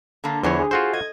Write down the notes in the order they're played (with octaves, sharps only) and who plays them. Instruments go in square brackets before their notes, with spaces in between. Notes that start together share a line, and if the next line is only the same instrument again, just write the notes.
[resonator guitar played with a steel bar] D3 A#3 [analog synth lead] A5
[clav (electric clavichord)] E2 E3 C#5 [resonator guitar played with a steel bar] A2 D3 C5 [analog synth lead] F3
[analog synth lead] G#4
[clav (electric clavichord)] F4 F#4 C5 [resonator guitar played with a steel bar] A4
[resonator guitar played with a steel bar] D#5 [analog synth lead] G#6